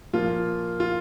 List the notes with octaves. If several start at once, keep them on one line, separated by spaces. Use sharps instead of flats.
A#2 F3 A#3 F4
F4